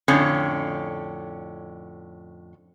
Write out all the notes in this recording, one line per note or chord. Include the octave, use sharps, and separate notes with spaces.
F2 A2 D3 C#4